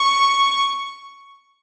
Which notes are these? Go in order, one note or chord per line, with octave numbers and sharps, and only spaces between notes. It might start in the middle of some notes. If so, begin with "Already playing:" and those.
Already playing: C#6